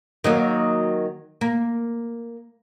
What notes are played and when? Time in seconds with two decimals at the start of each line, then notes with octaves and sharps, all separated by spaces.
0.24 D#3 F#3 A#3
1.41 A#3